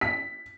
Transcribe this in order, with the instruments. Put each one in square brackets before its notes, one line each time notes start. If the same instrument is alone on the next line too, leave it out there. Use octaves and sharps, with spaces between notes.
[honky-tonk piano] B6